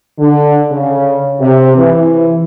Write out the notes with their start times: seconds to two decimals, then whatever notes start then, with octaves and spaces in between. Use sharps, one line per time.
0.19 D3
0.72 C#3
1.40 C3
1.77 E3